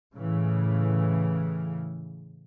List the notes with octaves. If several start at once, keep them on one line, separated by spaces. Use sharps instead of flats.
A2 C#3 E3